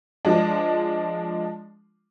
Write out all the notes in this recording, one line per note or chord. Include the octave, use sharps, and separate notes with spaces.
F3 G#3 D4